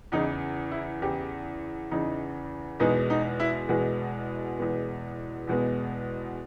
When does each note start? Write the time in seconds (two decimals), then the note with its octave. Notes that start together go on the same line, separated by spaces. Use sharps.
0.12 E2 C#3 E3 D#4
0.71 E4
1.01 E2 C#3 E3 G4
1.91 E2 C#3 E3 D#4
2.79 E2 B2 G#3 B3 D#4
3.10 D#4
3.40 E4
3.69 E2 B2 G#3 B3
4.59 E2 B2 G#3 B3
5.47 E2 B2 G#3 B3